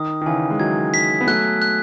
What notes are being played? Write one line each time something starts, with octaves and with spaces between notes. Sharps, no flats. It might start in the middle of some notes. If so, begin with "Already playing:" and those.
Already playing: D#3 D#6
D#3
C#3 E3 G#5
G#3
D#3 F#3 G#6
B6
B3
F#3 A3 F#6
F#6